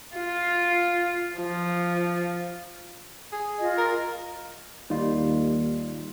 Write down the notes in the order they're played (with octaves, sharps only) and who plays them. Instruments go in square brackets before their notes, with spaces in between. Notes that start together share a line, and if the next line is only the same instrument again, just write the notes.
[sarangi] F4
F3
[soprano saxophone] G#4
[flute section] F4 D#5
[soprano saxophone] A#4
[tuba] D#2 [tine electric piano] G3 F4 [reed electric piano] D#4